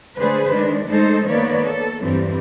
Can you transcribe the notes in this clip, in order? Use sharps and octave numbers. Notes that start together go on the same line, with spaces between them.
D3 A3 G#4 B4 C5
D#3 G#3 D4
G#3 A3 D#4 A4 C5
D#3 A#3 B3 B4 C#5 D5
A4
E2 G2 E3 G3 C4